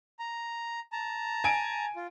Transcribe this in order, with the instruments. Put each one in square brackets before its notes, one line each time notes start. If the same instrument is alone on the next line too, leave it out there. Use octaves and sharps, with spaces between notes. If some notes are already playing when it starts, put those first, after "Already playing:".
[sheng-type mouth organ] A#5
A5 A#5
[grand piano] G#5 D7
[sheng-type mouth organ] F4